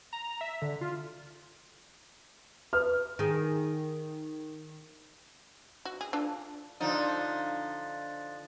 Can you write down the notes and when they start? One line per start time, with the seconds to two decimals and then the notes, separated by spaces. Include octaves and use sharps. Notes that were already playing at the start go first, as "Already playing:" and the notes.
0.13 A#5
0.41 E5
0.62 D3
0.81 F4
2.73 A4 B4 E5 F6
3.19 D#3 G#4
5.85 F#4
6.01 G#4
6.13 D4 F4 A4
6.80 D3 F3 D#4